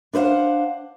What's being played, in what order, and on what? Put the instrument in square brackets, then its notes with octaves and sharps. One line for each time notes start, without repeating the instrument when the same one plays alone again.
[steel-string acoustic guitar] D4 B4 C5 F5 F#5